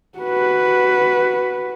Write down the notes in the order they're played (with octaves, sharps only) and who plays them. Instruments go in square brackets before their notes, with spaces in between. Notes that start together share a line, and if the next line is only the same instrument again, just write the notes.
[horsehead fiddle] F#4 B4